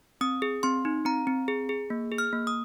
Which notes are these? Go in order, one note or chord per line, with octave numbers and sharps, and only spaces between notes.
C4 D#6
G#4
C4 C6
D#4
C4 A#5
C4
G#4
G#4
A#3
G#4
F6
A#3
D#6